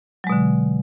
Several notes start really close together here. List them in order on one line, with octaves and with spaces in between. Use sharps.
F#3 G#3 B2 D3